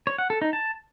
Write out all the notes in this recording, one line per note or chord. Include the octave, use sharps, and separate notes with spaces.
C#5
F#5
A4
D#4
A5